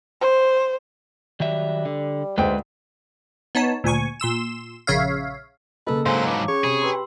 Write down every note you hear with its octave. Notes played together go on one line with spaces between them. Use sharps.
C5
D#3 F#3 G3 E5
D3
D2 G#2 G#3 B4 G5
B3 D#4 C#5 A5
D2 A#2 G#5 C#6
A#2 C6 E6 E7
A#1 C#3 C#5 E5 F5
C#3 A#3 A4 B4 D#5 E6
G#2 F#3 C5 F5 G#5 A#5
B4 A5 D6
C#4 G#4 C#5
C3 G#4 B5
G4 B4 A#5 C6 E6